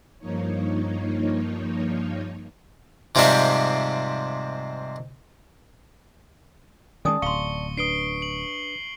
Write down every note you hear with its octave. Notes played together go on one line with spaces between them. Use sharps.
G2 F3 A#3 D#4 C#5
G#2 C3 F3 G3 C4 E5
D#3 F3 G#3 C#4 D5 G#5 A5 D#6
D1 F5 C6 C#6 C#7 G7
D4 B4 D#6 C7 D7 G7
F#7